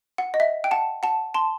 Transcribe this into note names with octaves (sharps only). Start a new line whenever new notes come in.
F#5
D#5
E5
G5
F#5 A5
F#5 A5
A5 C6